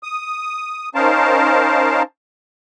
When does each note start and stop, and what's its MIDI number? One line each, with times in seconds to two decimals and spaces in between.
0.03 0.89 87
0.95 2.02 61
0.95 2.02 63
0.95 2.02 70
0.95 2.02 72
0.95 2.02 77
0.95 2.02 81